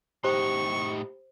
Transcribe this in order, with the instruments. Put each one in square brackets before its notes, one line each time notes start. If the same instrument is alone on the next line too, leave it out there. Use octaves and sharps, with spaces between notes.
[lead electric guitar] A2 D#4 [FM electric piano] G4 [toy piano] C5 [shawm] C#6